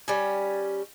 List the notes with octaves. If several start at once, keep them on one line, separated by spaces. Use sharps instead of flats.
G3 C#4